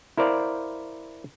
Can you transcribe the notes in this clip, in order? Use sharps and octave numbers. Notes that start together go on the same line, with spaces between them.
E4 A#4 C5 D5 F5